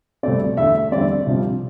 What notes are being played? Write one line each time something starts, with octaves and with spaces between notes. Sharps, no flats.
C2 B2 A3 C4 D5
E2 D3 A3 E5
E2 D3 G3 C4 D5
C2 C3 F3